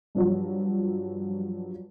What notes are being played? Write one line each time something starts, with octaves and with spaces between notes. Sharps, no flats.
G2 F3 F#3